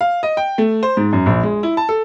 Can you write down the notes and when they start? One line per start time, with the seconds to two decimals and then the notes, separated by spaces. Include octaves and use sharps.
0.01 F5
0.23 D#5
0.37 G5
0.58 A3
0.83 C5
0.97 G#2
1.13 F#2
1.26 A#1
1.43 G#3
1.63 E4
1.77 A5
1.89 A4